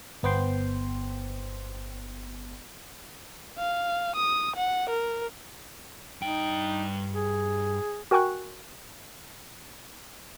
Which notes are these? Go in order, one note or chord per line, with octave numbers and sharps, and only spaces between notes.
G1 B3 C5 G5 C6
F5
D#6
F#5
A#4
G2 D#4 G5
G#4
F#4 A#4 G5 G#5 C#6 F#6